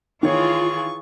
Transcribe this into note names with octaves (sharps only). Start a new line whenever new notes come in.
D#3 E3 F4 G#4 C#5 C#6